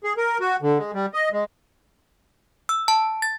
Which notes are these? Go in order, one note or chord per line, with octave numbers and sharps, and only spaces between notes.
G#4
A#4
F#4
D3
G#3
G3
D#5
G#3
E6
A5
A6